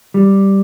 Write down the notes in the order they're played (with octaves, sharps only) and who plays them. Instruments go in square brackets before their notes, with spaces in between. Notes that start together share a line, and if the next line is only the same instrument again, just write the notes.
[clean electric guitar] G3